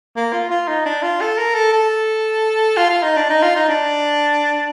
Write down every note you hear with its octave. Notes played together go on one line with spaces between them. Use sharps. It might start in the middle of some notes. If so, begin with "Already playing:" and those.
A#3
F4
F4
D#4
D4
F4
A4
A#4
A4
A4
F4
F4
D#4
D4
D#4
F4
D#4
D4